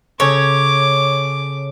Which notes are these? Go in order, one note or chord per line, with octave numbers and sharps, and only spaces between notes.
C#3 A4 C#5 D6